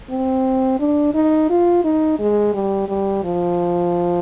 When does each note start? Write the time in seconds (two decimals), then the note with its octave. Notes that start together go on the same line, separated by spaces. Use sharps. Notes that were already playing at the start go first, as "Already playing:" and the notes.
0.10 C4
0.80 D4
1.14 D#4
1.50 F4
1.84 D#4
2.19 G#3
2.54 G3
2.88 G3
3.24 F3